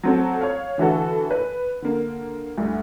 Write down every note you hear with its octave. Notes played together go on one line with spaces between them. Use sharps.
F#3 C4 A4
C#5 F5
D3 E3 F#4 A4
B4
D3 A#3
D2 G2